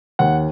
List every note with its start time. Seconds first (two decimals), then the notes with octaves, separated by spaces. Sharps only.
0.19 D#2 F#5